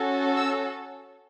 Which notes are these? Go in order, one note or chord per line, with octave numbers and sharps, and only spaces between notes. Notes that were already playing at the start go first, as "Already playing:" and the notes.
Already playing: C#4 F#4 A4
E6